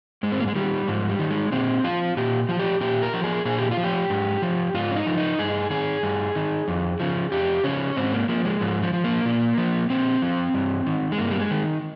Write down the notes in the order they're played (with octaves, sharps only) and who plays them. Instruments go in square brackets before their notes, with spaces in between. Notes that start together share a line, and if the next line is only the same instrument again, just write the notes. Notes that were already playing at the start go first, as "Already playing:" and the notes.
[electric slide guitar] G#2 G#3
C4
A#3
G#3
D#3 G3
G#2 F3
G3
D#3
G#3
A#2 C4
F3 F4
A#2 G4
F3 F4
G4
A#2 G4
A#4
F3
G#4
A#2 G#4
G4
F4
F3
G4
G#2
F3
G#2 F4
C#4
D#4
F3
D#4
G2 G#4
D#3 G#4
G2
D#3
F2
C#3 F3
F2 G4
C#3 F3 C#4
G#2 C4
A#3
F3 A#3
G#3
G#2 F3
F3
F3
A#3
A#2
F3
A#2 C4
F3
G2
D#3
G#3
G2 A#3
G3
G#3
D#3